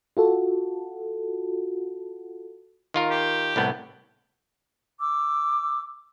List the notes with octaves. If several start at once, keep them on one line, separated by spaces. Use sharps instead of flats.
F4 F#4 A4
D#3 F4 A#4
G4
C2 A2 B3
D6 E6